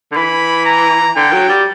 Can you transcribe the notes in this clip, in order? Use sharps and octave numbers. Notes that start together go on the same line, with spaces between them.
D3
E3 B5
A#5
D3 G5
F#3
G3